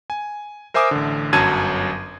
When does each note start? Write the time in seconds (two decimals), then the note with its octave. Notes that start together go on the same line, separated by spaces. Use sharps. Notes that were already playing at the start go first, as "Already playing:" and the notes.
0.10 G#5
0.74 A#4 C5 E5 G#5 D6 D#6
0.91 A1 D3
1.33 G1 F#2 F#3 A5 G#6 D#7